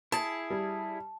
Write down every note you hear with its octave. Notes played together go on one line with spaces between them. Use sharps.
E4 G#4 A5
G3